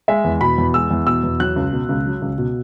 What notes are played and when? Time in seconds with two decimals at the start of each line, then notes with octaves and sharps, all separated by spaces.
0.08 G#3 E5
0.24 E2
0.41 B2 B5
0.58 E2
0.74 G#3 E6
0.91 E2
1.06 B2 E6
1.23 E2
1.40 F#3 F#6
1.56 C#2
1.73 B2
1.89 C#2
2.06 F#3
2.22 C#2
2.38 B2